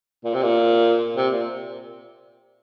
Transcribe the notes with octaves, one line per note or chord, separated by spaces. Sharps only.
A#2
C3
A#2
C3
A#2